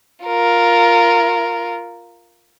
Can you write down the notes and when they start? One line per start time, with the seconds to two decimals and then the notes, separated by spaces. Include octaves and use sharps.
0.25 F4 A#4